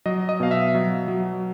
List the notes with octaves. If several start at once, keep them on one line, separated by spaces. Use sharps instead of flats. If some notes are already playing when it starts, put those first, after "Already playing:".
F#3 D#5
D#5
B2 F5
E5
F#3
F#3